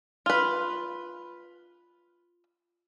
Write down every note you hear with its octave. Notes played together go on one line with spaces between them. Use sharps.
F4 B4